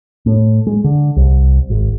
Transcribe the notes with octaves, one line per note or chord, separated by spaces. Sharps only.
A2
G#3
D3
C2
G#1